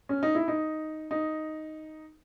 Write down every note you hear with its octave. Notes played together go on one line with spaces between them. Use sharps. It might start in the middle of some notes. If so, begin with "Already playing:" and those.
C#4
D#4
E4
D#4
D#4